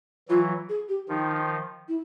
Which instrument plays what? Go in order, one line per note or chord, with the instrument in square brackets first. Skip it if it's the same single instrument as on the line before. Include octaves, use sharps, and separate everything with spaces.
[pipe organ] E3 F#3 [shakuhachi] F4
[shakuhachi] G#4
G4
[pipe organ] D#3 F3 [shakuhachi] D#4
[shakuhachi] E4